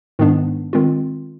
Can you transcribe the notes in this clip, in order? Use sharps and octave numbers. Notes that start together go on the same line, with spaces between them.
G#2 D#3 G#3 B3 D4
D#3 G#3 C4 F4